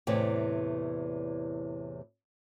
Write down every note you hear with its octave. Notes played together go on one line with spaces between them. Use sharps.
E2 A2 C3 E3